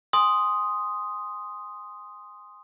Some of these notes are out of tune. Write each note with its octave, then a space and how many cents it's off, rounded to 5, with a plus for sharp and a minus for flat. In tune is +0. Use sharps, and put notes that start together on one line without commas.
G#5 -25 C6 +0 D#6 +0